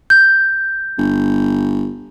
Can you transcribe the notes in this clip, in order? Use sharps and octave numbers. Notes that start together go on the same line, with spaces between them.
G6
G1